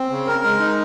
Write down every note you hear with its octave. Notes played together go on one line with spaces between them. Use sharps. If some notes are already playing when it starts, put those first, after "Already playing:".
Already playing: C4
C#3
A#4
G#3
D#4